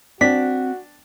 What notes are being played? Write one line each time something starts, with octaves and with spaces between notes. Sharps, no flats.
C4 D4 F#4 B6